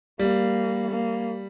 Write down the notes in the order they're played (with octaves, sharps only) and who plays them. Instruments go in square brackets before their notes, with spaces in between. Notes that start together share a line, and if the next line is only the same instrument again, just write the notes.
[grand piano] G3 [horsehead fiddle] A#3
[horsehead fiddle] A#3